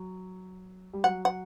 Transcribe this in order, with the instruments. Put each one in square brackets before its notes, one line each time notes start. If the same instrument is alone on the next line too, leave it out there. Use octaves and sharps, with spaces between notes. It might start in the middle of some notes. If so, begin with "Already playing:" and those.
Already playing: [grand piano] F#3
G3
[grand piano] F#3 [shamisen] F#5
[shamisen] F#5